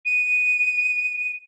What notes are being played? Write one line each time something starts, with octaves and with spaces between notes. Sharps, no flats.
D#7